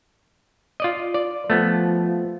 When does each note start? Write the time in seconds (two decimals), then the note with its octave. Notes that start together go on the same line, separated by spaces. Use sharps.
0.80 F4 D5 D#5
1.14 D5
1.50 F3 A3 B3